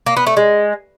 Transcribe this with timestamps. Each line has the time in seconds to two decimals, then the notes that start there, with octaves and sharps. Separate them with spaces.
0.07 A#3
0.17 B3
0.27 A3
0.37 G#3